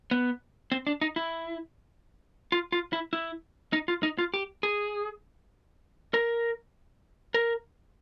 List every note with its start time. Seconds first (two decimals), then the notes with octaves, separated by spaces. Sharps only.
0.11 B3
0.72 C4
0.87 D4
1.01 D#4
1.16 E4
2.52 F4
2.72 F4
2.93 E4
3.13 E4
3.73 D#4
3.88 F4
4.03 D#4
4.18 F4
4.34 G4
4.63 G#4
6.14 A#4
7.34 A#4